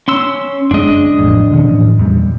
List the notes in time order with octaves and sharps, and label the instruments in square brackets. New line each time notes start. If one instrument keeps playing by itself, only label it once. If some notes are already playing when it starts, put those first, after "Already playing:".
[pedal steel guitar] C#4 C6 E6
[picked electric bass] F#1 G#3 [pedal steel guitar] D4 D#5
[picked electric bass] A1 F2
B2 D#3 C#4
A2 E3 F3
E2 A#2 G3